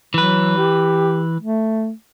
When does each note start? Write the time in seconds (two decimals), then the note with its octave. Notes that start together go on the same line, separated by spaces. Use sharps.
0.14 E3 F#3 B4
0.57 G4
1.40 A3